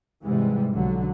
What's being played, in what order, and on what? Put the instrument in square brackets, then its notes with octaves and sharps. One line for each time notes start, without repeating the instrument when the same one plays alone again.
[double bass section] G#2 C3 E3 G3 G#3
B1 D3 F#3